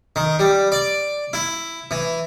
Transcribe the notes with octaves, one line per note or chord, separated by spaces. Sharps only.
D#3
G3
D5
E4
E3